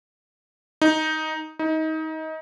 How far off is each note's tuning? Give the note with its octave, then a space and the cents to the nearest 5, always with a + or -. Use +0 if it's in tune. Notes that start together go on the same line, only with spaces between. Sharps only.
D#4 +5
D#4 +25